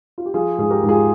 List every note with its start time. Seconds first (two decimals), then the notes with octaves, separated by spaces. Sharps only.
0.18 F4
0.26 G4
0.34 F3 F4 G#4
0.58 G#2 G#4
0.70 G4 A#4
0.83 G#2
0.89 F4 G#4